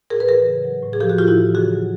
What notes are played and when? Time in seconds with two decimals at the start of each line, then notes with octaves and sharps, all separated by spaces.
0.10 A2 G#4 A#4
0.20 B4
0.28 E3 G#4 A#4
0.47 C#3
0.64 F#3
0.83 A2
0.93 G#4
1.00 F3 G4 A4
1.09 F#4 G#4
1.18 A2 F4 G4
1.28 E4 F#4
1.37 E3
1.55 C#3 F#4 G#4
1.73 F#3